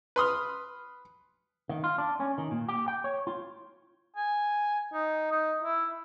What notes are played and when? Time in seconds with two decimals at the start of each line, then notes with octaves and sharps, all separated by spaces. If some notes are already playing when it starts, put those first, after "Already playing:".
0.16 B4 C6 D#6 F6
1.69 D#3
1.84 F4
1.98 D4
2.20 C#4
2.38 D#3
2.51 A#2
2.68 G4
2.88 G5
3.04 C#5
3.27 F4
4.16 G#5
4.93 D#4
5.31 D#4
5.63 E4